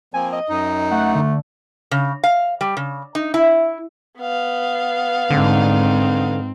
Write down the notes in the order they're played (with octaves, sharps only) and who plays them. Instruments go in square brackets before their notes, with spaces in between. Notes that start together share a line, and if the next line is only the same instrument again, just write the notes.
[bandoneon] F3 A#3 C4 [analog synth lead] G#5
[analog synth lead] D#5
[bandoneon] F#2 D#4
[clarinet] A3 [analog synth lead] F#5
[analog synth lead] D3
[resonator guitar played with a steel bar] C#3
F5
G3
C#3
D#4
E4
[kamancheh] B3 F5
[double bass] G#2 D#4 [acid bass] D3 [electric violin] C4